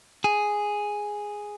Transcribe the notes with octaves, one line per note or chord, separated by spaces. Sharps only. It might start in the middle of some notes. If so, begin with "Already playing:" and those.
G#4